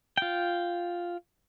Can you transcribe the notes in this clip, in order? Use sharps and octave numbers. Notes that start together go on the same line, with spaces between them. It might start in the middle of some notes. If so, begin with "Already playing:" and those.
F4 G5